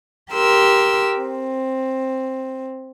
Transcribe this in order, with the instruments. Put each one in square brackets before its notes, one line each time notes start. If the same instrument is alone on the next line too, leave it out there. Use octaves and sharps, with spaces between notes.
[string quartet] G4 A#4 C6 E6
C4